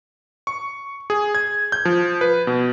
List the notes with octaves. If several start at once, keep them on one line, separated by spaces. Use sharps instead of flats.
C#6
G#4
G#6
G6
F3
B4
B2